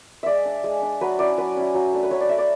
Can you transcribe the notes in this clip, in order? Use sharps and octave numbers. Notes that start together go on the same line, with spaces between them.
G#3 D5 E5
D4
G#3
D4
F#3 B4
C#4 E4 D5
F#3 B4
C#4 E4
F#3
A3 D4
B4
F#3 C#5
D5
A3 D4 E5
D5